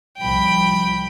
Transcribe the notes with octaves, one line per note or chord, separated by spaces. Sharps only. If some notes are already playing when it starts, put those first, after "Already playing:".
C2 F3 G3 G5 B5